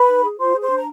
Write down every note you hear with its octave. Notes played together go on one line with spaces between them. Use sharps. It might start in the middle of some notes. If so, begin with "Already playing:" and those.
Already playing: B4 B5
D#4
G#4
F4 C5 C6
G#4
C5 C6
D4
A#5